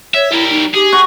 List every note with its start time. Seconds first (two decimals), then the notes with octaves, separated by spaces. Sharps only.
0.14 C#5 E5
0.32 G3 E4 A#4
0.50 D#4
0.74 G4 G#4
0.92 F#4